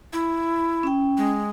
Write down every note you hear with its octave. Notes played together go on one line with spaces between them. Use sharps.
E4
C#4 G5
G#3